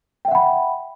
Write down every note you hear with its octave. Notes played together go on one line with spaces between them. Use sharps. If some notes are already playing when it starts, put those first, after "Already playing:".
E5 F#5 G5 B5